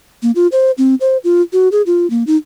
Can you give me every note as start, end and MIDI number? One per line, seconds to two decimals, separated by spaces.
0.23 0.31 58
0.35 0.47 65
0.52 0.71 72
0.78 0.95 60
1.01 1.17 72
1.24 1.42 65
1.53 1.69 66
1.72 1.82 68
1.86 2.09 65
2.10 2.24 58
2.27 2.37 63